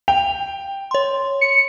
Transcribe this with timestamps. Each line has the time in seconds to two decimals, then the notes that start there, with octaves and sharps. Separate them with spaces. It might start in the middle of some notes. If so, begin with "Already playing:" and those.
0.08 G5 F7
0.91 C#5 C6
1.41 C#7